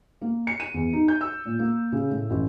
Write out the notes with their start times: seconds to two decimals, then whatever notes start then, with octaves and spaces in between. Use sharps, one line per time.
0.21 A#3
0.47 C#7
0.60 D#7
0.74 E2
0.93 D#4
1.08 G6
1.21 E6
1.45 A#2
1.59 A#3
1.92 C#3
2.11 A2
2.30 A1